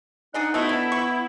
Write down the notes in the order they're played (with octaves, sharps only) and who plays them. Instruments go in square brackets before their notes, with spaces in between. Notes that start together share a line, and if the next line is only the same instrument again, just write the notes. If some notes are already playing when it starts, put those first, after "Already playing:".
[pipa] D4 G#4 D#5 [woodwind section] D#4 F#5
[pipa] A3 D#4 F#4 [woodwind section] B3 E4
[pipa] D3
C#6